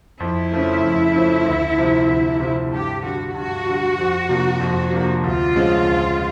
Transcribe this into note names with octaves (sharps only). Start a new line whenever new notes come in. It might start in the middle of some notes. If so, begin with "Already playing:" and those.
F2 E4
C#3 F3 A3
F2
C#3 F3 A3
D2
C3 F3
D2
C3 F3
G2 G4
D3 G3 F#4
G2 F#4
D3 G3
F2
C3 F3 A#3 D4
F2
C3 F3 A#3 D4
D2 F4
C#3 F3 G#3
D2